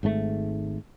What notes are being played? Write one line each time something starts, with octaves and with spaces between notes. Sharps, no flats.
G#1 G#2 C3 A3